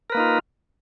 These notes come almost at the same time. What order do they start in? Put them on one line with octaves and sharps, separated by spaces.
A#4 B4 A#3 D#4 F4